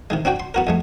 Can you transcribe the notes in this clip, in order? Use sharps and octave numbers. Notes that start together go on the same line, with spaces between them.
C3 D#3 G#3
C4 D4 F#4 G5
C6
B3 F#4 A#4
F2 G#3 A3